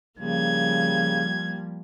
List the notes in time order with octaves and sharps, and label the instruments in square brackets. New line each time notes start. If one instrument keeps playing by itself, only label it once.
[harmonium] C#3 [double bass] F3 G3 [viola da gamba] A#3 [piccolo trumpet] G#6